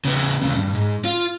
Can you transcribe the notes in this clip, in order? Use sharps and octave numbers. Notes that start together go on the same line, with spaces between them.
C#3 B3
D#2 C#3
C2 G2
G#2
F4